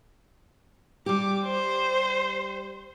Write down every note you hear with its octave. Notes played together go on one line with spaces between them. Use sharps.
G3 G4 D6
C5